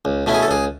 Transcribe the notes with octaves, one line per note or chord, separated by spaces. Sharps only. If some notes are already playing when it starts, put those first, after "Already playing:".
C#2
B2 A3 C#4 E4
G#4
A4
C#2 G#4